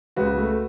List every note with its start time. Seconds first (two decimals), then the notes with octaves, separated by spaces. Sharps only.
0.16 C#2 F#4 B4
0.38 A3